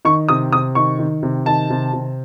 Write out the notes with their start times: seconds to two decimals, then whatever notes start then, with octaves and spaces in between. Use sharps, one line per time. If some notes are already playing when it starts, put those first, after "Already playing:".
0.05 D#3 C#6
0.29 C3 D#6
0.52 C3 D#6
0.75 D#3 C#6
0.99 D#3
1.23 C3
1.46 D#3 A5
1.70 C3
1.94 C3